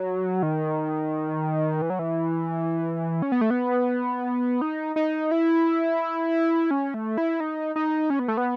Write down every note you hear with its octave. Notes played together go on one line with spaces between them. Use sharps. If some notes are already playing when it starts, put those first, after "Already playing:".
Already playing: F#3
D#3
E3
F#3
E3
C#4
B3
A3
B3
D#4
D#4
E4
C#4
A3
E4
D#4
D#4
C#4
B3
A3
B3